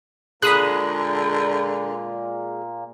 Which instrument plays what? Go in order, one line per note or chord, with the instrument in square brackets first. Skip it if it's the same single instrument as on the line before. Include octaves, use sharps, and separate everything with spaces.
[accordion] A#2 A#3 [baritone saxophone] D3 [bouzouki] G#3 [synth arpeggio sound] B5 D#6 F#6